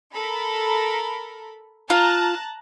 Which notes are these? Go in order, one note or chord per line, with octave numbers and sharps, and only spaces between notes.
A4 A#4 B5
F4 A5 A#5 F#6